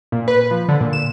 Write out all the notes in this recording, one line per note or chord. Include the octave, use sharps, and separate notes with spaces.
A#2
B4
F3
D3
A#2
E7